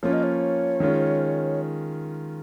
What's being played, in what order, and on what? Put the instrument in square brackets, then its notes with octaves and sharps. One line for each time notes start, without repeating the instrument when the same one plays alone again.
[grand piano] F3 A#3 C#4 F4 [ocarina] C#5
[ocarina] D#5
C#5
[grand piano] D#3 G#3 C#4 F4